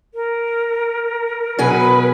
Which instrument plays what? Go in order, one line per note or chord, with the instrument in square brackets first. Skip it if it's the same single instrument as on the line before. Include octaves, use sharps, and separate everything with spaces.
[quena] A#4
[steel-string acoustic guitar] B2 G#4 G#5 [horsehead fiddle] F#3 B4